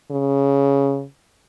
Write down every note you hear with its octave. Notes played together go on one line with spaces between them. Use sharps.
C#3